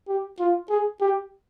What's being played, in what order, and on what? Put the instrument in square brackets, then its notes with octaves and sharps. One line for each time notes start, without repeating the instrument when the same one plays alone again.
[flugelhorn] G4
F4
G#4
G4